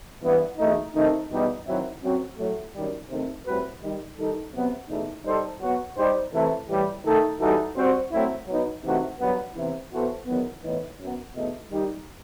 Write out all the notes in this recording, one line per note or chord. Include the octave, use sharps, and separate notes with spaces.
G2 E3 B3
E2 B2 A3 D#4
C3 D#3 A3 D#4
E2 B2 G3 D#4
D#3 F#3 C4 E4
F#2 F#3 C4 F#4
A2 F#3 A3
F#2 D#3 G3
C3 D#3 A3 C4 D#4
A2 G3 C4 F#4 B4
D#3 G3 D#4
D#3 G3 D#4 A4
C3 F#3 B3
E2 B2 A3 D#4
G3 D#4 A4 C5
F#3 B3 F#4
G3 D#4 G4 C5
C3 E3 A3 E4 A4
A2 E3 G3
D#3 A3 D#4 A4
E3 G3 D#4 F#4 A4
G3 C4 F#4 C5
F#3 A3 C4 E4
F#3 B3 D#4
C3 E3 A3 D#4 F#4
G2 F#3 B3
C3 E3 B3 E4
E3 B3 F#4 A4 C5
E2 D#3 F#3 B3
A2 E3 B3 D#4
F#2 F#3 B3
E2 B2 A3 D#4
D#3 G3 D#4 G4